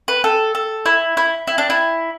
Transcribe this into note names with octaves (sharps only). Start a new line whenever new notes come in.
B4
A4
A4
E4
E4
E4
D4
E4